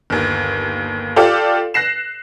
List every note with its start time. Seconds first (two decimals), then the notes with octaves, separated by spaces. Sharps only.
0.10 G1 D#2
1.16 F4 G4 A4 D5 F5
1.74 F#6 A#6 C7 E7